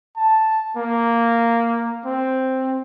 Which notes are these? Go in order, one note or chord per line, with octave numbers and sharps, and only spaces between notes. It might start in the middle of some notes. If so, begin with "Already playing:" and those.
A5
A#3
C4